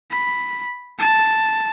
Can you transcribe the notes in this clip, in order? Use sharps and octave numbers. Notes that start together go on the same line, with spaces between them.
B5
A5